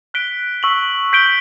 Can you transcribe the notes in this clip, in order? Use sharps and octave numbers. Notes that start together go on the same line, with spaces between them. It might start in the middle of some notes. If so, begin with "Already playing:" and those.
F#6 B6 D7 G7
C#6 E6 B6 F#7
G6 B6 D7 G7